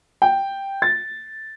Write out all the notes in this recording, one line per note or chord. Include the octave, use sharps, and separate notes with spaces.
G5
A6